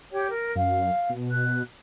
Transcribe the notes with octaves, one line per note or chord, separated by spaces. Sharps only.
G4 C#5 G5
A#4
F#2 F5
B2
F#6